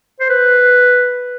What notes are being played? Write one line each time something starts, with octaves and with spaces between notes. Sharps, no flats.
C5
B4